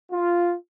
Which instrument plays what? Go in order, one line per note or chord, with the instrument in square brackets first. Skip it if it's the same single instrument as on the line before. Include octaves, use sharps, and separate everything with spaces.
[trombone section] F4